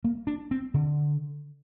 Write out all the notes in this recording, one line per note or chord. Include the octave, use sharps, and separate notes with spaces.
A#3
D4
C4
D3